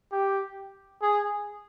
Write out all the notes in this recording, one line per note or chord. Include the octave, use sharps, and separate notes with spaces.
G4
G#4